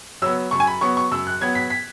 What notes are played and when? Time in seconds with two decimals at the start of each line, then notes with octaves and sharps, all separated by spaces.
0.22 F#3 B3 E6
0.51 F#2 C#6
0.60 G#5
0.67 B5
0.81 F#3 B3 C#6
0.97 C#6
1.11 F#2 E6
1.27 F#6
1.41 F#3 B3 G#6
1.55 B6
1.70 B6